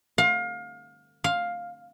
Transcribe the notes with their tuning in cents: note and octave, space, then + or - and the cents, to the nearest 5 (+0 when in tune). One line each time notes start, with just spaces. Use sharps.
F5 +30
F5 +10